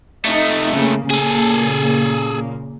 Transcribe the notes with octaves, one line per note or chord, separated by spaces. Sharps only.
F2 A3 D#4
C#3 A#3
A#2 C#3 A#3 G#4 A4